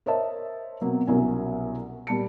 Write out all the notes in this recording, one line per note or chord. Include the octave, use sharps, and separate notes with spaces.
A#4 C5 C#5 D#5 E5 A5
B2 F#3 A#3 C4
C2 B2 F#3 C#4 A#4 G#5
A#2 G3 A5 C#7